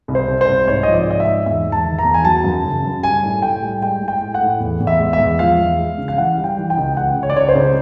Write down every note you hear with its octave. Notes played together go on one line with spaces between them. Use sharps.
C2
C5
C2
C5
C2
G#2 C#5
F3 D#5
D5
G#2 D#5
E5
G#2
E2 E5
E2
A5
D#3
A#5
E2
G#5
F#3 A5
F#2
C#3
F#2
G3 G#5
A2
A2 G5
G3
G#3 G5
A2
G5
A2
F#5
A2
E2
E2
E5
G#3
E5
E2
F3 F5
E2
G#3
C#3
F5
E3 F#5
G3
G5
E3
G5
C#2
C#2 F#5
C#2
C#5
D5
C#2 C#5
C5
C#3